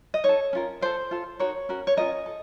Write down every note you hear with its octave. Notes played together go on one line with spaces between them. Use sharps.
D#5
D#4 A4 C#5
C#4 F4 A#4
F4 A4 C5
F4 A4
D#4 F#4 A#4 C#5
C#4 F#4 A#4
C#5
C#4 D#4 F4 A#4 D#5
A4